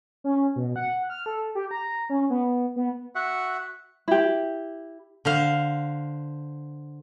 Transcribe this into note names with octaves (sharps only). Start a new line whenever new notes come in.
C#4
B2
F#5
F6
A4
G4
A#5
C#4
B3
B3
F#4 E5 F#5
E4 G4
D3 C5 F5